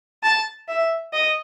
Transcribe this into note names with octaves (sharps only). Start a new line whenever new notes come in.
A5
E5
D#5